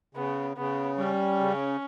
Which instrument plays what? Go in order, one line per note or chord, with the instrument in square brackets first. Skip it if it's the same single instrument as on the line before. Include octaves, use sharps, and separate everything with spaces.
[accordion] C#3 [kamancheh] B3
[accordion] C#3 [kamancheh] B3
[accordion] G3 [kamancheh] C#4
[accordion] C#3